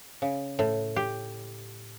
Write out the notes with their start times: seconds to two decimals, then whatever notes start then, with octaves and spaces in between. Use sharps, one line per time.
0.22 C#3
0.59 A2
0.96 G4